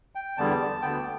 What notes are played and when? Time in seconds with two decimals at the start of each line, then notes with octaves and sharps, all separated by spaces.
0.15 G5
0.37 E2 D3 G3 B3 A5
0.82 D2 D3 B3 G5